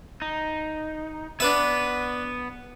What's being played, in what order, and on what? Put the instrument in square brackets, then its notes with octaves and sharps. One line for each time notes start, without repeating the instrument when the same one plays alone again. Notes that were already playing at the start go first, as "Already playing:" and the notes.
[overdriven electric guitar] D#4
[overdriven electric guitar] B3 [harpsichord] D4 B4 E5